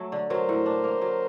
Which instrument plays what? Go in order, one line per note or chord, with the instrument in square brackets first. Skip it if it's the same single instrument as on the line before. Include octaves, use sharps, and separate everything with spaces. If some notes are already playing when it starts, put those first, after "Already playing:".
Already playing: [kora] F#3 A3
D3
[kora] F#3 [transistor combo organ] A#4 C5
[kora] A2
D4
A#3
F#3